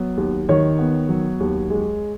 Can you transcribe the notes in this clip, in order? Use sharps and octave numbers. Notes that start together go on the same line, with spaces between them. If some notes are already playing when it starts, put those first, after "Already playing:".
Already playing: F#3 B3
D#2
D#3 C#5
B3
F#3
D#2
G#3